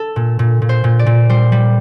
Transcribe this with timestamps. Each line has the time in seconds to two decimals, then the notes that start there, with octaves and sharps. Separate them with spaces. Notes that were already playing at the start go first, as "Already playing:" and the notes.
Already playing: A4
0.16 A#2
0.39 A#2
0.62 A#2
0.69 C5
0.84 A#2
0.99 D5
1.06 A#2
1.29 G3 C5
1.52 G3